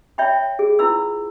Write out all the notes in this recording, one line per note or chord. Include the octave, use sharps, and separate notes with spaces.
C#5 E5 G5 B5
G#4
E4 F4 B4 B5 E6